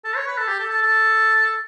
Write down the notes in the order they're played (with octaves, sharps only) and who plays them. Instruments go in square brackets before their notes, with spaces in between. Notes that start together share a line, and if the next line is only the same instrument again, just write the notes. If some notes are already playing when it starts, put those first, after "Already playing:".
[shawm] A4
C#5
B4
A4
G4
A4
A4
A4